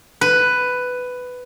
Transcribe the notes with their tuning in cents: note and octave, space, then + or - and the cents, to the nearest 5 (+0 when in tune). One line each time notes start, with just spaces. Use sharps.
B4 +10